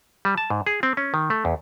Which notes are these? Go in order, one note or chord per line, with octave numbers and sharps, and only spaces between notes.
G3
A5
G#2
G#4
C4
C#4
D#3
A3
E2